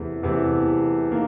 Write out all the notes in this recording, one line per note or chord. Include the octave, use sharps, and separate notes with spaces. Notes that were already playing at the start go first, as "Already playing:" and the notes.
Already playing: E2 C3 E3 A3 E5
E2 C3 E3 A3
D#3 A#3